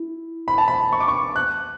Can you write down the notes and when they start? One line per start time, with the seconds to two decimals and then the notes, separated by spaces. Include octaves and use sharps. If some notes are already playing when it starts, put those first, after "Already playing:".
Already playing: E4
0.48 B5
0.58 A5
0.68 B5
0.93 C#6
1.00 D6
1.08 C#6
1.36 F#6